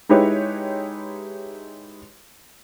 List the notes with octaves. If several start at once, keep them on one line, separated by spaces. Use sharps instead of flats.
G#3 D#4 E4 G4 B4 C#5